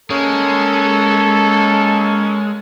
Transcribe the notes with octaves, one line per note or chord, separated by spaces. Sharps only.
G#3 A#3 C#4 A4